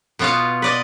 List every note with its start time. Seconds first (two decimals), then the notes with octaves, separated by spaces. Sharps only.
0.19 B2 B3 F4 F#4 F5
0.62 B4 D5 D#5